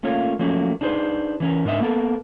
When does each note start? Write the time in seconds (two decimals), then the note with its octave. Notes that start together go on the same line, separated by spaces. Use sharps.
0.03 A3 A#3 C#4 F4 A#4 C#5
0.39 F3 F#3 A3 A#3 C#4
0.81 D4 D#4 G#4 B4 C5
1.40 E3 C#4 A#4
1.65 G#2 D4 A#4 D#5 E5
1.80 A#3 B3 A4 A#4